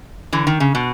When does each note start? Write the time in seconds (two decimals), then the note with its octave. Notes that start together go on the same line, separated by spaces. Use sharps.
0.33 D3 E3
0.47 D#3
0.60 C#3
0.75 B2